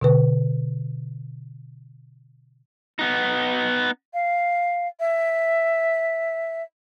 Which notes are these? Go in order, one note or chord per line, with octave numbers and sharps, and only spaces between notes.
B2 D3 B4
B3 D#4
F5
E5